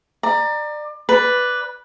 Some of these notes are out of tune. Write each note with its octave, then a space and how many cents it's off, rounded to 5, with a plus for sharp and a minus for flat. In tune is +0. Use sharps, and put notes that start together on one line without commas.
D5 +30 A#5 +0
B4 +0 D5 +0